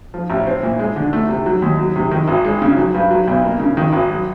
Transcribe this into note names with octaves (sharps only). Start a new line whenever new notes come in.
F3
A1
C4
A#2
G#3
D3
A3
C3
F#3
D#2
F#3
C3
D#3
G#1
G#3
C#3
F#3
G2
F#3
B1
A#3
C#3
D#3
G#1
F#3